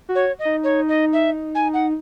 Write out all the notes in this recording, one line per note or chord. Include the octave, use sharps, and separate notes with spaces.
F#4
C#5
D#5
D#4
C#5
D#5
E5
G#5
F#5